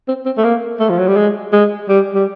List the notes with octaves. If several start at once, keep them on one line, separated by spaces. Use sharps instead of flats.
C4
C4
A3
A#3
A3
F3
F#3
G3
G#3
G#3
G3
G3